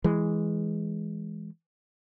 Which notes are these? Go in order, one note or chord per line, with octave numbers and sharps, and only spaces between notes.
E3 G#3